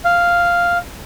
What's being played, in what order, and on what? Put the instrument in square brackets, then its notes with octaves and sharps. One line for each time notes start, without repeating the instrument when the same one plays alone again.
[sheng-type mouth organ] F5